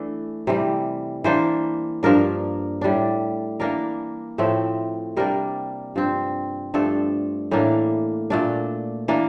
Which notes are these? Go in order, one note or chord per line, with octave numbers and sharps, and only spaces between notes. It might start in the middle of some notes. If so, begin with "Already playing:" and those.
Already playing: E3 A3 D4
C3 E3 G3
E3 A#3 D4 C5
G2 F3 A#3 D4 A#4
A2 G3 D4
E3 A#3 D4 A#4
A2 F3 A3 C4
C3 G3 A#3 D4 A#4
G2 F3 C4
G2 F3 A3 D4 A4
A2 E3 A#3 D4
A#2 A3 D4
E3 A#3 D4